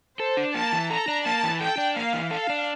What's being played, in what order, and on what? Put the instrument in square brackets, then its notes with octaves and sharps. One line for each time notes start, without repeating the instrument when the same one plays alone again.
[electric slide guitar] A4 [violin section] C5
[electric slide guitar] D4
[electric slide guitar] A#3 [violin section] A5
[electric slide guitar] E3
[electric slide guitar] A4 [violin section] A#5
[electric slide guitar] D4
[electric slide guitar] A#3 [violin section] A5
[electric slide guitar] E3
[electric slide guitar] A4 [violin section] G5
[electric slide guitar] D4
[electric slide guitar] A#3 [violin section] F5
[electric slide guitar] E3
[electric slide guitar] A4 [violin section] F5
[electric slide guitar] D4